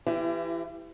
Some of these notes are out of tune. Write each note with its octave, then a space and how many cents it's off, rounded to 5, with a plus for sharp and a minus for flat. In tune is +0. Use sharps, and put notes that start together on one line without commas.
E3 +20 E4 +45 G4 +5